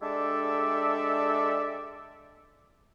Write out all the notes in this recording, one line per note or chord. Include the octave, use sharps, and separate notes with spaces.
G#3 D4 G4 A4 D5 E5